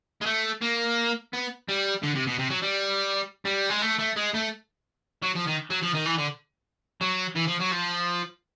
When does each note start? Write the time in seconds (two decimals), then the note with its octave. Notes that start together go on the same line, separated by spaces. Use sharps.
0.21 G#3
0.26 A3
0.61 A#3
1.33 B3
1.69 G3
2.03 D3
2.15 C3
2.27 B2
2.39 C3
2.50 F#3
2.62 G3
3.45 G3
3.69 G#3
3.82 A3
3.98 A3
4.16 G#3
4.34 A3
5.23 F#3
5.36 F3
5.47 D#3
5.70 F#3
5.83 F3
5.94 D#3
6.05 E3
6.18 D3
7.01 F#3
7.36 E3
7.48 F3
7.60 F#3
7.72 F3